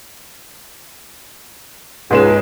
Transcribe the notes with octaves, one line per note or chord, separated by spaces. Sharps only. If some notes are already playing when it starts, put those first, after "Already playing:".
C#2 G#2 G#3 E7